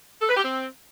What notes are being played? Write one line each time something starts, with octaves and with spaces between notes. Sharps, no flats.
A4
B4
G4
C4